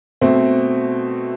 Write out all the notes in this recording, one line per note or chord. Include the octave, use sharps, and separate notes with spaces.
B2 A3 C4